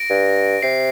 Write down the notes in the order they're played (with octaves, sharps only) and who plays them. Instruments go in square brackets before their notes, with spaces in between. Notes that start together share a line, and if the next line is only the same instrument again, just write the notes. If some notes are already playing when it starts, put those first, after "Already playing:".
Already playing: [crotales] A#6 D7
[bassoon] G2
[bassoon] C3 [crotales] C7